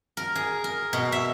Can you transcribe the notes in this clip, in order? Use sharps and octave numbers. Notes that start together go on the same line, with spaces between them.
A#4
G#4
A#4
B2
E5